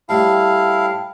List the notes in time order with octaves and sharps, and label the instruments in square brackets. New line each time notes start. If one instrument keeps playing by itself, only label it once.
[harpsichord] A2 G3 [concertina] E4 F5 [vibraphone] G5 A5